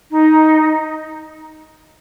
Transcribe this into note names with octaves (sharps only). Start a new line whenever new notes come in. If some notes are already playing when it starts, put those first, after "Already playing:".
D#4